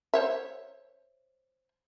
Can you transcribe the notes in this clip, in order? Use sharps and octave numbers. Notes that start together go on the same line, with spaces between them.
C5 C#5 E5